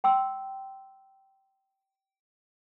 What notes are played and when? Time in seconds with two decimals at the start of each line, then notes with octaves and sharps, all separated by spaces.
0.04 G5 C6 E6